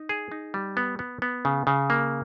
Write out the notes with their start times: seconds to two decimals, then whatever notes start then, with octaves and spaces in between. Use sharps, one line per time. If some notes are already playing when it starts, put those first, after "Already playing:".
Already playing: D#4
0.09 G#4
0.32 D#4
0.54 G3
0.77 B3
0.99 B3
1.22 B3
1.45 C#3
1.67 C#3
1.90 A#3